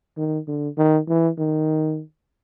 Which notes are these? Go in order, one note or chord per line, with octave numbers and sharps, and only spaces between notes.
D#3
D3
D#3
E3
D#3